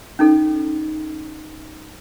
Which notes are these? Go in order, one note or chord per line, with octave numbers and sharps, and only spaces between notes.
C#4 D#4 A4